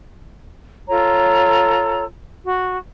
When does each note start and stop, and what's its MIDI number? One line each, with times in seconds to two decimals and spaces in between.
0.90 2.04 65
0.90 2.04 69
0.90 2.04 73
0.90 2.04 82
2.45 2.76 66